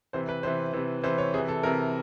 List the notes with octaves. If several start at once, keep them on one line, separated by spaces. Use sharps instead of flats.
C3 E3 C5
B4
C3 E3 C5
C3 E3
C3 E3 C5
C#5
C3 E3 G#4
A4
C3 E3 A#4